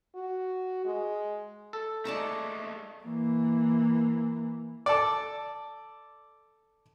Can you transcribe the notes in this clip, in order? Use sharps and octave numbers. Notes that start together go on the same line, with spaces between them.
F#4
G#3
A4
G#3 A3 D5 A5 A#5
E3 A#3
A4 D5